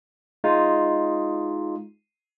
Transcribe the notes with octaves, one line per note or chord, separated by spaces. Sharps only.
G#3 D#4 F4